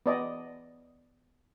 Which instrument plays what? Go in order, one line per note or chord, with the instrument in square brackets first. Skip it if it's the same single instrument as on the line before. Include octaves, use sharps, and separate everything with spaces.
[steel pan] B3 D5 D#5